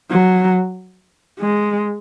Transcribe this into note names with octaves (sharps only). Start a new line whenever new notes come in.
F#3
G#3